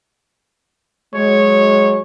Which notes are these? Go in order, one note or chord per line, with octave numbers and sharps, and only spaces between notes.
F#3 G#3 C#5